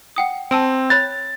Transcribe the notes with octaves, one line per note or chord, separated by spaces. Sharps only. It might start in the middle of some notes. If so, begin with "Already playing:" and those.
F#5 G5 D#6
C4 A5 E6 D7
C#5 B5 F#6 A6